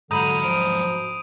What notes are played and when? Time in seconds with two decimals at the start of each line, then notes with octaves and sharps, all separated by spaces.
0.11 G#2 D3 F#3 A#5 B5 D#6 G6 D#7
0.44 F3 D7 D#7